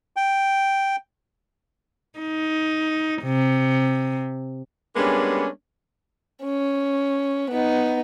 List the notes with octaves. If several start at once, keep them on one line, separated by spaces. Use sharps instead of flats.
G5
D#4
C3
G3 G#3 A#3 B3 C#4 D4
C#4
B3 D#4